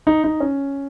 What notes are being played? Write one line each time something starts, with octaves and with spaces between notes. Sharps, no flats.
D#4
D#4
C#4